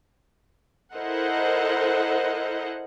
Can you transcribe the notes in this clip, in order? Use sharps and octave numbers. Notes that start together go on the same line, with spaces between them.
E4 A4 A#4 C5 D#5 F#5